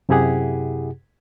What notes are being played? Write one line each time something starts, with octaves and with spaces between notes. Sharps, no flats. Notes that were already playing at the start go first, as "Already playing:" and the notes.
F#2 C3 E4 G4 G#4 F#5